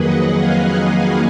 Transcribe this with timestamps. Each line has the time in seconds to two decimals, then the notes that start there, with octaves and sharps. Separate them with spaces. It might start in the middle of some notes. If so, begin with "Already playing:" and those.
Already playing: F2 D#3 F#3 A#3 G#4 B4 D#5 F#5
0.33 F5 G#5